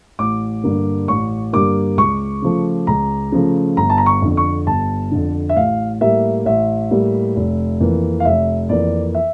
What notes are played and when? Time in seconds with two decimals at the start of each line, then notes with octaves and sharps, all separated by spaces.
0.19 A1 D6
0.63 G2 D3 G3 A#3
1.08 A1 C#6
1.53 G2 D3 G3 A#3 D6
1.97 C#2 C#6
2.42 C#3 F3 A3
2.87 C#2 A#5
3.32 C#3 F3 A3
3.77 G1 A#5
3.90 A5
3.98 A#5
4.06 C#6
4.22 F2 D3
4.37 C#6
4.66 G1 A5
5.11 F2 D3
5.49 E5
5.56 A1 F5
6.01 A2 G3 A#3 E5
6.45 A1 E5
6.91 A2 G3 A#3
7.36 F1
7.80 F2 E3 A#3
8.20 F5
8.25 F1 E5
8.69 F2 E3 A#3 D5
9.15 E5